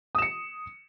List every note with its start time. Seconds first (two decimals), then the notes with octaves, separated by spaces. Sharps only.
0.15 D#6
0.18 E7
0.22 C#7